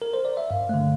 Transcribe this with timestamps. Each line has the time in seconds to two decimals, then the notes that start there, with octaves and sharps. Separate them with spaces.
0.02 A#4
0.14 C5
0.25 D5
0.37 E5
0.50 G2 F5
0.69 D3 A3